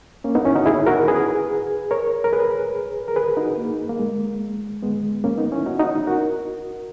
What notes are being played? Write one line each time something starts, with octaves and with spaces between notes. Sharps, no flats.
A#3 C#4
B3 D#4
C#4 E4
D#4 F#4
E4 G#4
F#4 A#4
G#4 B4
A#4 C#5
A#4
G#4 B4
A#4
G#4 B4
D#4 F#4
A#3
A#3
G#3
G#3 B3
A#3 C#4
B3 D#4
C#4 E4
D#4 F#4
D#4 F#4
F#4 A#4